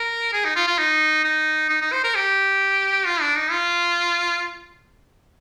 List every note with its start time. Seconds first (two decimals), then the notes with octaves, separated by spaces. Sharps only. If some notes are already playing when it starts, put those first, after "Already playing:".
Already playing: A#4
0.33 G#4
0.45 D#4
0.56 F4
0.67 F4
0.78 D#4
1.24 D#4
1.69 D#4
1.81 D#4
1.92 C5
2.04 A#4
2.15 G4
3.06 F4
3.21 D4
3.37 D#4
3.51 F4